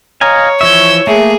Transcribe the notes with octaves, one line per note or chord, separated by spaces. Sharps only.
C#5 D#5 F5 G#5 A#5
E3 F3 E5 C#6 E6 G6 G#6
A3 A#3 G#4 E5